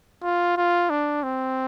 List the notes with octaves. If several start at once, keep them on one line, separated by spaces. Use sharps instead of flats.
F4
F4
D4
C4